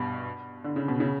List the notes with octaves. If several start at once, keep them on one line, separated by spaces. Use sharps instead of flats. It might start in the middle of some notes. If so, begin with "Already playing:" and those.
Already playing: G2 B2
D3
C#3
B2
C#3